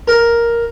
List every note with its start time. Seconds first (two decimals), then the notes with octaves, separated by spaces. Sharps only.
0.08 A#4